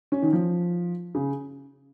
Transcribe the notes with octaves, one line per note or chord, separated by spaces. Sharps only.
C#4
D#3
F3
C#3